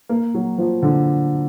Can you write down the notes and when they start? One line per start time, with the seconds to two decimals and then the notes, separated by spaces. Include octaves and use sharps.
0.09 A#3
0.34 F#3
0.58 F3
0.82 D3